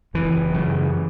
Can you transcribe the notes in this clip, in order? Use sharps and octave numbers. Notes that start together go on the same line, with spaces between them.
F#1 E3
F#2 C#3